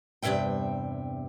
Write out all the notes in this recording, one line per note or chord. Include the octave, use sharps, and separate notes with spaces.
E2 G2 C3 E3 E5 G5